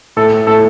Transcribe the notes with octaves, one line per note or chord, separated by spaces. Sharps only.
A2 A4
A2 A4